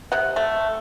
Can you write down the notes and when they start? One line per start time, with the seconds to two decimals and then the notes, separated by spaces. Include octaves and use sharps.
0.12 C3 F#5
0.36 A3